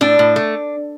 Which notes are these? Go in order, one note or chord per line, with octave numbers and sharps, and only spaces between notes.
A2 D4
A2
A3